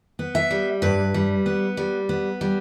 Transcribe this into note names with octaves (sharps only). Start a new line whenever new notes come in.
B3
E5
G3
G2 B4
G3
B3
G3
B3
G3